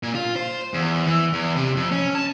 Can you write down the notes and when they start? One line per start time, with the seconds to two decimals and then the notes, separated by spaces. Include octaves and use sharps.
0.03 A#2
0.15 F4
0.36 C5
0.74 E2
1.06 E3
1.33 E2
1.56 C3
1.76 F2
1.92 C#4
2.15 A5